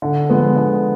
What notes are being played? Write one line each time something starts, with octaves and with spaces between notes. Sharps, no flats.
D3
F3 G#3 B3
D3